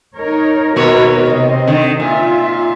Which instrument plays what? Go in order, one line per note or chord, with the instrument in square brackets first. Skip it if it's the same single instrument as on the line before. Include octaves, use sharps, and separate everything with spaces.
[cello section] D#4 A#4 C#5
[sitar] D#2 B2 C#5 [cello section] F#4 A#4 B4
[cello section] C3 C4 D#5
[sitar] D3 D#3
[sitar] A#2 [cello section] F4 E5